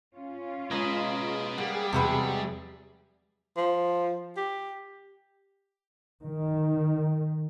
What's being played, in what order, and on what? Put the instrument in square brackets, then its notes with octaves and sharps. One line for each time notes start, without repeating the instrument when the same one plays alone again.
[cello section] C#4 F4
[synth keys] G#3 A#5 G#6 [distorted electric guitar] B4 D#5
[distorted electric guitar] G3 [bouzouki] A#3 [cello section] G#4 [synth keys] F#5
[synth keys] E2 G#3 E5 [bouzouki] C3 F#4 B4
[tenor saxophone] F3
G4
[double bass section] D#3